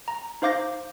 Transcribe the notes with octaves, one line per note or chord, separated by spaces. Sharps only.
A#5
D#4 C5 F5 D6 G6 A#6